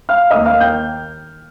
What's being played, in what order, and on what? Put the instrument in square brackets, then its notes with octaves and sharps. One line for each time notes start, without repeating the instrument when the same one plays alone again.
[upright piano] F5 F6
[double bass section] D#2 D#3 A#3 [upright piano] D#5 D#6
[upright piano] F5 F6
G5 G6